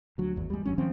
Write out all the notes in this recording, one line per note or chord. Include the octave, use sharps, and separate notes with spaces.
D2 F#3
G#1 E2
G3 G#3
G1 F#3 C#4
D#3 F3 C4 C#4